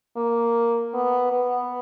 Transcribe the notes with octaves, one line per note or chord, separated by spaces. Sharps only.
A#3
B3
B3